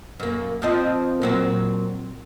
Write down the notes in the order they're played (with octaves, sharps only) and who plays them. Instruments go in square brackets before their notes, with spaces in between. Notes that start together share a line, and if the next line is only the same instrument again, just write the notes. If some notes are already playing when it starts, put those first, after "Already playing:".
[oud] F#2 A#3
F3 C4 D#5
A#2 F#3 C4